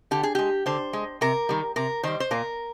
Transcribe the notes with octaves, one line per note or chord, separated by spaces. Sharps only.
D3 G4
G#4
G#3 G4
D3 C5
G#3
C3 A#4
D#3 G3
C3 A#4
D#3 G3 C5
C5
A#2 A#4